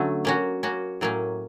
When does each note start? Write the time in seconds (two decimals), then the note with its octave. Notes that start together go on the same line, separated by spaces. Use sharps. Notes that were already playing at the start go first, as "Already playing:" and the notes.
Already playing: D3 F#3 A3 C#4
0.25 A#3 C#4 F#4
0.63 A#3 C#4 F#4
1.01 A2 F#3 A#3 C#4